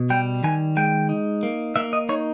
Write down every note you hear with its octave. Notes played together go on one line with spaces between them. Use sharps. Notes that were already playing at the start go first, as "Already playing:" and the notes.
Already playing: B2
G3 G5
D#3 G#5
G#3 G5
D#4
A#3
A#3 E5
D#5
D#4 C#5